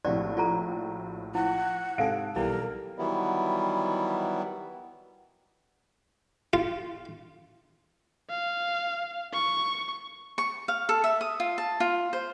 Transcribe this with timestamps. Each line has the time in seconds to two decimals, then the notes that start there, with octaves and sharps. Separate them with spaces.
0.05 A#1 A2 C3 F#4 D5
0.37 F4 F#4 A4 A#5
1.35 F3 E4 F#5
1.98 G#2 C3 G#4 A4 F5 D7
2.36 B1 E3 G3 E4 A#4
2.98 D#3 E3 F#3 G3 B3 E4
6.53 F4
8.30 F5
9.33 C#6
10.38 C#6
10.68 F5
10.89 A4
11.04 E5
11.21 D#6
11.40 F4
11.58 A5
11.80 F4
12.13 C5